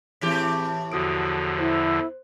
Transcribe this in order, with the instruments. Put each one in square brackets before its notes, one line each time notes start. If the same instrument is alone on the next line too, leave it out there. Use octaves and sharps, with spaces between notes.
[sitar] A2 E3 G4 [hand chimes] C4 G#4 B6
[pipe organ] E2 D3 F3 [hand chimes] F#4 D#6 D7
[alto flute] E4 [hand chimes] C5